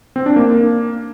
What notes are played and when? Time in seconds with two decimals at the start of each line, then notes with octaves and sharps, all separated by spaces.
0.16 C4
0.26 D4
0.36 A#3